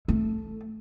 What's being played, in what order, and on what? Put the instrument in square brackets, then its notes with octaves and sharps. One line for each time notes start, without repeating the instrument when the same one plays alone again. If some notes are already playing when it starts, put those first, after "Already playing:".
[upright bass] A3